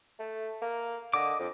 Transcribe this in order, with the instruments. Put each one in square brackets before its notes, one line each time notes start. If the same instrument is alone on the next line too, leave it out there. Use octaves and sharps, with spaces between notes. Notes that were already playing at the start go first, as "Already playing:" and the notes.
[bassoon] A3
A#3
[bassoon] D3 [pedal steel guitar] D#5 D6
[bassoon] F2